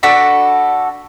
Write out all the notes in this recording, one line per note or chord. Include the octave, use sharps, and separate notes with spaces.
D4 F#4 A4 B5